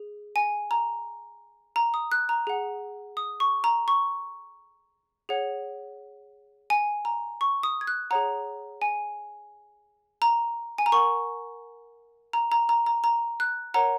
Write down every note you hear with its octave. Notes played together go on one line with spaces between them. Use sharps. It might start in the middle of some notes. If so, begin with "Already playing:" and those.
Already playing: G#4
G#5
A#5
A#5
D#6
F#6
A#5
G#4 F#5
D#6
C#6
A#5
C#6
G#4 C#5 F#5
G#5
A#5
C#6
D#6
G#6
F#6
G#4 C#5 F#5 A#5
G#5
A#5
G#5
A#5
A#4 F#5 C#6
A#5
A#5
A#5
A#5
A#5
F#6
A#4 C#5 F#5 A#5